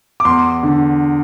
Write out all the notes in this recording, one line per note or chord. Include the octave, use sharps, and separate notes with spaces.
D6
E2 C6
D3